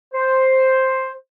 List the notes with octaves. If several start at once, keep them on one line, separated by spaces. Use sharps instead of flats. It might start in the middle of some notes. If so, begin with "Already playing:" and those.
C5